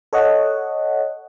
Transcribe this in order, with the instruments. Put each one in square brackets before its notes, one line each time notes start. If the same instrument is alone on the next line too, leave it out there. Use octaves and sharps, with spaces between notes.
[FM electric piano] A4 C#5 D#5 F#5